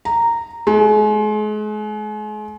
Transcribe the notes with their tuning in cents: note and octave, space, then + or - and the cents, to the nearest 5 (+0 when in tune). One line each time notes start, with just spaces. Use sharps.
A#5 -10
G#3 +35